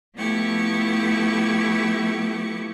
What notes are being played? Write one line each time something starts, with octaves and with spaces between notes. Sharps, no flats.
F3 A3 B3 E4 G4 C#6